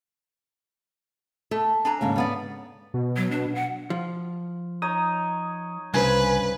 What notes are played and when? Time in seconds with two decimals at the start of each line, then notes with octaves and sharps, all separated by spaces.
1.51 A3 A4
1.85 D4 G#5 A#5
2.01 D#2 G#2 C#3
2.16 G3 B3 D5
2.94 B2
3.17 F#3
3.31 D4
3.55 F#5
3.90 F3
4.82 D#4 C#5 D#6
5.94 C2 G2 C#3 B4 C5 G#5